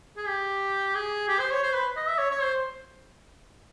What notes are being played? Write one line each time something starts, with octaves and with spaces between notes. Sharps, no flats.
G#4
G4
G#4
G4
C5
C#5
C5
B4
D#5
E5
C#5
C#5
C5